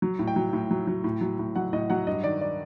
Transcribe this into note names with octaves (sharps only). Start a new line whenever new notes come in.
F#3
A2
G5
F#3
A2
F#3
F#3
A2
F#3
A2
F#3 F#5
A2 D#5
F#3 F#5
G2 D#5
D#3 D5
D5